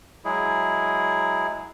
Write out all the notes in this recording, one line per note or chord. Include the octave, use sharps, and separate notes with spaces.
F#3 G#3 E4 G#4